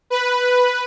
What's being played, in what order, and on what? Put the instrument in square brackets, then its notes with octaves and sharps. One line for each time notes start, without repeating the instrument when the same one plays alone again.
[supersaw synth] B4